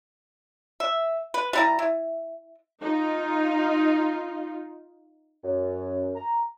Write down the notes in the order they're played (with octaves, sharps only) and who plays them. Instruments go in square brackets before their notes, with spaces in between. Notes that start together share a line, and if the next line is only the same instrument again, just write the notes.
[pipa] E5
B4
G3 E4 A#5
E4
[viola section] D#4 F4
[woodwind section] F#2
A#5